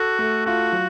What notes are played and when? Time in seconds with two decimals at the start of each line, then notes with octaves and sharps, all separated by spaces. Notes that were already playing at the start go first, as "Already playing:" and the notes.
Already playing: F#4 A4
0.19 A3
0.46 F4 F#4
0.72 F#3